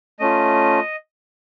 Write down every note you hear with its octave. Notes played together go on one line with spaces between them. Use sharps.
A3 C#4 F4 D#5